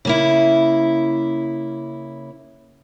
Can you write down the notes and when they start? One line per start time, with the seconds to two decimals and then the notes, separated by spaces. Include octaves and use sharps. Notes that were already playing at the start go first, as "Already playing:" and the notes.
0.05 C#3 A#3 E4